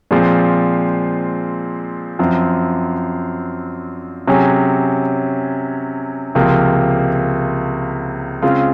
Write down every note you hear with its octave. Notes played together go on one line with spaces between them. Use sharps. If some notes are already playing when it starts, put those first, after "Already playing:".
A#2 F3 G#3 C4
F#2 F3 C4
C3 F#3 C#4 G#4
C#2 C3 F3 A#3
C#3 G#3 C4 F4